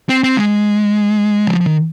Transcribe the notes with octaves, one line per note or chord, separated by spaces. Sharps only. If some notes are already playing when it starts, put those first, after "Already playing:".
C4
C4
G#3
F3
F3
D#3